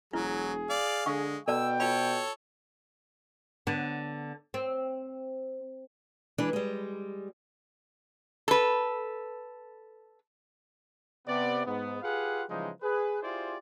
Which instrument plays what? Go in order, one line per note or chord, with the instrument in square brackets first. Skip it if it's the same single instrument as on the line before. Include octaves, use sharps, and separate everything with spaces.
[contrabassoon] E1 [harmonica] F#3 [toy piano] E4 [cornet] G#4
[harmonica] D5 F5
[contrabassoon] D3 [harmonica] G#3 [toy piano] F5 C#6
[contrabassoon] B2 [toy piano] A4 D5 A5 [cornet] G5 [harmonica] E6
[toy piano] F4 B5 [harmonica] A4 C#5
[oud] D3 B3
C4
[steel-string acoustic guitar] E3 G#3 D4 B4
G3 G#3
[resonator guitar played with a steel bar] A4 B4
[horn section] C3 B3 D5
G#2 B3
F4 G4 G#4 B4 F5 F#5
C#3 E3 F3 G3 G#3 D#4
G#4 B4
E4 F4 G4 G#4 C5 D5